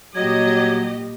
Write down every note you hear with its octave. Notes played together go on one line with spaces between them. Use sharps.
A#2 F#3 G3 G4 D#5 G#6